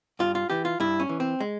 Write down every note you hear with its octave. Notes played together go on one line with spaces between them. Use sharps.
G2 F4
F4
E3 G4
F4
G2 E4
C#4
E3
C4
G#3